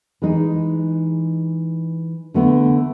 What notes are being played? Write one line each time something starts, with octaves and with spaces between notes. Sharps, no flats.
E3 G#3 D#4
D3 A3 B3